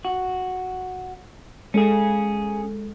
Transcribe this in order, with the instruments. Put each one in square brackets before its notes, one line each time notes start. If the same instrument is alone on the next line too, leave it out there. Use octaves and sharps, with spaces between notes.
[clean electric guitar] F#4
[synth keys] G#3 A4 [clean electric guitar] C#4 G#4